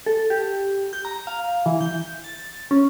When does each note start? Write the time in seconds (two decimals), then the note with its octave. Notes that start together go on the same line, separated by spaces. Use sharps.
0.06 A4
0.30 G4
0.93 G6
1.05 A#5
1.27 F5
1.66 E3
1.81 G6
2.24 A6
2.71 C#4